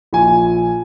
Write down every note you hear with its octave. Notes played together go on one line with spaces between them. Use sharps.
A#1 G#5